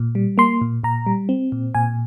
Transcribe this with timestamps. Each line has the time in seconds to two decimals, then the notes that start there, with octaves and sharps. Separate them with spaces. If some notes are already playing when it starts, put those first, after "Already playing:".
Already playing: A#2
0.15 G3
0.38 A#3 C6
0.62 A#2
0.83 A#2 A#5
1.07 G3
1.29 C4
1.52 A#2
1.75 A#2 G#5